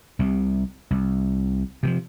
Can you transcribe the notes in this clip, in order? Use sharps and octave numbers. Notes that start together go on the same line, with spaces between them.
C2 C3
C2
C3 E3 F3